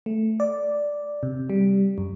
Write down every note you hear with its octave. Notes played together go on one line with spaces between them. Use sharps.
A3
D5
C3
G3
F#2